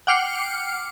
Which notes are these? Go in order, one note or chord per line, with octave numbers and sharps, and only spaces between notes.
F#5 G5 D6 F6 C7 C#7